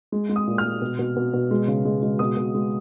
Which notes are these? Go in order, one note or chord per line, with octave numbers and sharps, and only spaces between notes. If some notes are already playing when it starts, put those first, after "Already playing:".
G#3
G#3
D#6
A#2
F6
G#3
B2
B2
B2
B2
G#3
C#3
G#3
G#3
B2 D#6
B2
G#3